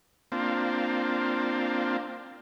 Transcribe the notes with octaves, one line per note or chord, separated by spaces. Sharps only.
A#3 C4 D4 F4